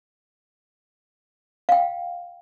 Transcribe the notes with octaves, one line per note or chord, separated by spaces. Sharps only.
F5 G5